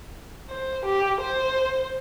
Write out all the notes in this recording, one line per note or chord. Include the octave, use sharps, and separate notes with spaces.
C5
G4
C5